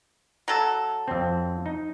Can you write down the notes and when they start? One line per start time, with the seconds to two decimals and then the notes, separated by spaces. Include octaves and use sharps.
0.48 F#3 A4
1.08 F2 C4
1.66 D#4